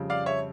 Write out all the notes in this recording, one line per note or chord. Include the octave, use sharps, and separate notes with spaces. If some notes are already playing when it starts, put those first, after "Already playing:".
Already playing: F2 C#3 G3
D5 F5
C#5 E5